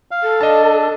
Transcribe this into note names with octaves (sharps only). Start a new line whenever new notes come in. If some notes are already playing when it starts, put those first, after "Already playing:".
F5
A4
D4 D#5 A5